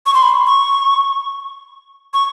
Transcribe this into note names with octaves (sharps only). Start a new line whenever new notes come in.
C#6
C6
B5
C#6
C#6